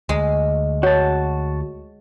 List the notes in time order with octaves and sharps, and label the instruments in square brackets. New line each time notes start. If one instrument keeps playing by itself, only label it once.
[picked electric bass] D2 [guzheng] G#3
[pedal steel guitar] F#4 A5 [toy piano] C#5